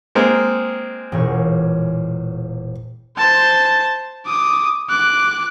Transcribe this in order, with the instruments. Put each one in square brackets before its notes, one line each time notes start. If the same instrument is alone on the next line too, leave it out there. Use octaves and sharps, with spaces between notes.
[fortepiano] G#3 A#3 C4
[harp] E1 A#2 C#5
[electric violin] C5 A5
D6 D#6
D6 F#6